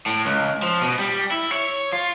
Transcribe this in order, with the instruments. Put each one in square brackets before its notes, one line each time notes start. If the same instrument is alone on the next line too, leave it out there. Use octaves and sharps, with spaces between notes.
[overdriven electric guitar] A2
C#2
F3
B2
G3
E4
C#5
F4